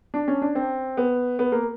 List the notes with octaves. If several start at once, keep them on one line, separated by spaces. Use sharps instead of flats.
D4
C#4
D4
C4
B3
B3
A#3